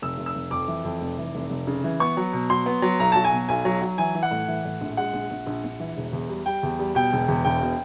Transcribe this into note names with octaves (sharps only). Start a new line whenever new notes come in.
F1 E6
F1
E6
F1
F2 D6
E3
F2
F1
E3
F1
F1
C#3
E3
B3 C#6
F#3
B2
F#3 C6
B3
F#3
B1 A#5
F#3 A5
G#5
B2
B1 G#5
F#3
F#3
E3 G#5
E3
F#5
A2
E3
A2
A#1
G#3 F#5
A#1
A#1
A#1
A#1
E3
E1
E2
G3
G3 G5
E2
G3
B2 G5
E1
E2
E1 G5
B2